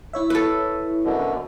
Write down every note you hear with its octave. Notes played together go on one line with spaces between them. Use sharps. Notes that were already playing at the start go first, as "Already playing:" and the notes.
E4 C#5 E5
A4 B4
F#2 B2 D3